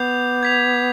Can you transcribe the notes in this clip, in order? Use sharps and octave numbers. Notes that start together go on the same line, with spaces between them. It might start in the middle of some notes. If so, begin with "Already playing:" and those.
Already playing: B3 D6 G6 C7 F7
G#6 B6 F7